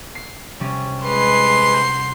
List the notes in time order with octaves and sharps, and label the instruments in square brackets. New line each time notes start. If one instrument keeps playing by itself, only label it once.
[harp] C7
C3 G3 C#4
[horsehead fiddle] G#3 B4 [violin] C6 C7
[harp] F#5 A#5 G6